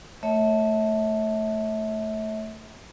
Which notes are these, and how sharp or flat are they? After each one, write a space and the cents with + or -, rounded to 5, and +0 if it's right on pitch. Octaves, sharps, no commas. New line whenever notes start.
A3 +0 C#5 +5 E5 -35